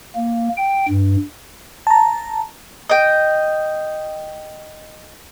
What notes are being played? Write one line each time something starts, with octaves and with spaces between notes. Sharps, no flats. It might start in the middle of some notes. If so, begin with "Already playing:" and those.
A#3
G5
G2
A5 A#5
D#5 G5